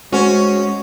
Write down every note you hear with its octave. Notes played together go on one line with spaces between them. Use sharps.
G#3 C#4 F#4 C5